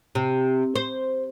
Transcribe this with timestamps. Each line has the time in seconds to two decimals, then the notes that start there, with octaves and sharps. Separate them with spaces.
0.15 C3
0.76 C5